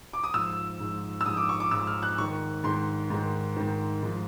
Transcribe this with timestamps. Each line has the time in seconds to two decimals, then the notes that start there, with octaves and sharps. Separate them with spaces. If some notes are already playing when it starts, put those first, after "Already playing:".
0.13 D6
0.24 D#6
0.34 G#2 F3 E6
0.80 G#2 F3
1.21 E6
1.26 G#2 F3 D#6
1.37 D6
1.49 C#6
1.60 D6
1.71 G#2 F3 E6
1.87 F6
2.03 F#6
2.18 G#2 D#3 C#6
2.64 G#2 D#3 C6
3.10 G#2 D#3
3.56 G#2 D#3
4.03 G#2 F3